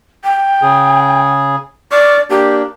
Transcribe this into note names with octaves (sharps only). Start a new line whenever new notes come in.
G5
C#3 G#4
D5 C#6 D6 F6
A#3 D4 G4